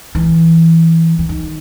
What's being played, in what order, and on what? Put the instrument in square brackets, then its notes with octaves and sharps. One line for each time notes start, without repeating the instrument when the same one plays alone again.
[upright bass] E3
E3
D#3